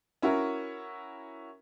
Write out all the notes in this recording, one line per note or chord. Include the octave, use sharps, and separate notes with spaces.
C#4 E4 F#4 A#4